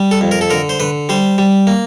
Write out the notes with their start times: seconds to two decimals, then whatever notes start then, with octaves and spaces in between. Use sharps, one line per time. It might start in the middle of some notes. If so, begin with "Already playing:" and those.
Already playing: G3
0.11 A4
0.21 F2
0.31 A#4
0.41 A4
0.50 D3 A#4
0.69 C5
0.80 D3 B4
1.09 G3 C5
1.38 G3
1.67 A#3